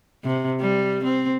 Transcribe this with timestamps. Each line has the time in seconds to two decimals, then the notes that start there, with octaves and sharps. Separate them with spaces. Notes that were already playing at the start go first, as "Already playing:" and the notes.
0.24 C3
0.60 G3
1.04 C4